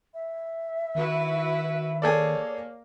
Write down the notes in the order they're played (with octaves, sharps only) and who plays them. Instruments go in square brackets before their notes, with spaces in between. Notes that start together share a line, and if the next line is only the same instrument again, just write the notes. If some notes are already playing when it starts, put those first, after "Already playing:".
[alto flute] E5
[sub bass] D#3 [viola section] E4 F#4 B4
[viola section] A#3 [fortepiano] G#4 A4 D5 [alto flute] C#5